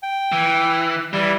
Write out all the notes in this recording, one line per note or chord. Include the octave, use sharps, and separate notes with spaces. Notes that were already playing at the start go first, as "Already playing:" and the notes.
G5
E3
E3 G3